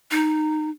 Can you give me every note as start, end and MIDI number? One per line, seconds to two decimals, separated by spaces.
0.11 0.70 63